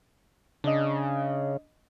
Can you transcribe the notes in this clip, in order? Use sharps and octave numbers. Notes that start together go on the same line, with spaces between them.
C#3 D4 D#5